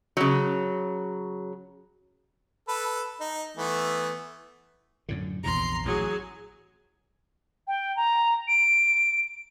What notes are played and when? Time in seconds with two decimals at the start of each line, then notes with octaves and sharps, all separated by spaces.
0.17 C#3 F#3
2.68 A4 B4
3.20 D#4
3.57 E3 A3 B3
5.09 F#2 A2 D3
5.44 A#1 E2 C3 A#5 C6
5.85 A1 F#3 G#4
7.68 G5
7.96 A#5
8.48 D7